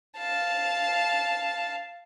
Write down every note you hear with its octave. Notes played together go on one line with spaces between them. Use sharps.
F5 A5